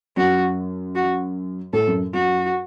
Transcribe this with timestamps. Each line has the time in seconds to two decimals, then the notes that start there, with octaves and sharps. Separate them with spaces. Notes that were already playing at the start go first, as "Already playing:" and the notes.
0.17 F#2 F#4
0.95 F#4
1.73 A2 A4
1.87 F#2
2.13 F#2 F#4